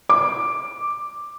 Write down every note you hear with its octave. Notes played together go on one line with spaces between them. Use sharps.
D6